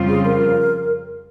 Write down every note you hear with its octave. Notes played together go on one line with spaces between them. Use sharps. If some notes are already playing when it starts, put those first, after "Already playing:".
Already playing: F2 C#3 G3 C4 F4
G#4
A#4